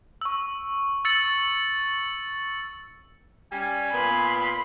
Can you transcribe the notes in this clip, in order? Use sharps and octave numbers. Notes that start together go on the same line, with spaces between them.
C#6 E6
E6 A6 C#7 F#7
G3 C#4 G#5
A#2 B3 B5 C6